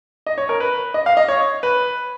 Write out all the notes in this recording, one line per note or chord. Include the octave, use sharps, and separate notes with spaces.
D#5
C#5
A#4
B4
D#5
F5
D#5
C#5
B4